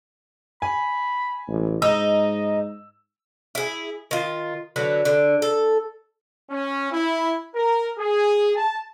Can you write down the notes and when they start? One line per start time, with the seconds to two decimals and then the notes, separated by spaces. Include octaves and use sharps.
0.62 G#5 B5
1.48 A1
1.82 G#2 D#4 D#5 E6
3.55 E4 G#4
4.11 D#3 F4
4.76 D3 F#3 B3
5.05 D3
5.42 A4
6.51 C#4
6.91 E4
7.55 A#4
7.99 G#4
8.56 A5